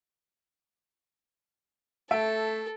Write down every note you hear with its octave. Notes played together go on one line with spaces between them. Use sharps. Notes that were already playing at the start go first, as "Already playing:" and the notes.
A3 A4 E5 D7